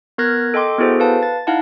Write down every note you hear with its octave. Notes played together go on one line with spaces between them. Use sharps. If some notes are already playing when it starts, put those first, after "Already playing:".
B3 A#4 F6 F#6 G#6 A#6
A4 D#5 G5 C6 D6
B3 E4 F#4 G#4 A4 C5
B4 F5 A5
A6
D#4 E4 F5 F#5 A5